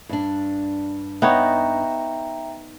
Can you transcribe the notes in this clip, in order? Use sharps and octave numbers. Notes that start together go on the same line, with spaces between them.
G2 D4
B3 D#4 C#5 E5 G5 A#5